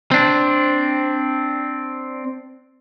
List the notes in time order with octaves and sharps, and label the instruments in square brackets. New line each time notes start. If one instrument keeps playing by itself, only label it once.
[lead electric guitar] C4 D4